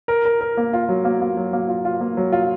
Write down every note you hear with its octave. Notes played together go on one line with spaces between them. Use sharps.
A#4
A#4
A#4
A#3
F4
F#3
A#3
A#3
F#3
A#3
F4
F4
A#3
F#3
F4